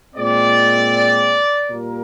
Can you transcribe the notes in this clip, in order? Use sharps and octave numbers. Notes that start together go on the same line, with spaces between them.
A#2 G#3 C4 D5
A#2 G3 A#3 A#4